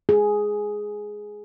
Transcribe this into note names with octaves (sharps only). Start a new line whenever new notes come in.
G#4